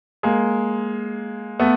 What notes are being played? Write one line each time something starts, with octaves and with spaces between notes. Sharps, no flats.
G#3 A#3
A3 B3